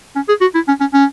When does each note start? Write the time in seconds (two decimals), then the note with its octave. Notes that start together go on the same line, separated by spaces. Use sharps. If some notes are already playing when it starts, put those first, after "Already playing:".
0.16 C#4
0.28 G#4
0.41 F#4
0.55 E4
0.68 C#4
0.80 C#4
0.93 C#4